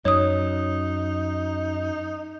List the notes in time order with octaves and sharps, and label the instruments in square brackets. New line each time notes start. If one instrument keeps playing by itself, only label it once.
[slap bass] F#2 [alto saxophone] D#4 [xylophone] C#5 D#6